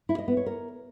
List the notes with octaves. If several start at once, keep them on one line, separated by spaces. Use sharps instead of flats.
E4
D#5
B3
C#5
A#4